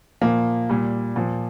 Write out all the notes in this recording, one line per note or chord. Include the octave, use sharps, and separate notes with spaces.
A#2 F3 A#3
A#2 G3
A#2 F3